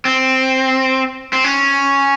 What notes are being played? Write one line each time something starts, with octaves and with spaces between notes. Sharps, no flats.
C4
C4
C#4